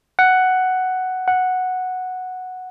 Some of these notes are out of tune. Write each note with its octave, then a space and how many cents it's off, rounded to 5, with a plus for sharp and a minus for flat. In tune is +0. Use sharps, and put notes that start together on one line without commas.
F#5 +5
F#5 -5